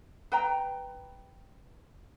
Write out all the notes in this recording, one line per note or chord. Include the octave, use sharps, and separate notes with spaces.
B4 G5 A#5